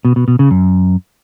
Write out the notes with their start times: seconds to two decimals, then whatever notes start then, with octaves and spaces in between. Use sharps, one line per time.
0.05 B2
0.16 B2
0.28 B2
0.39 C#3
0.51 F#2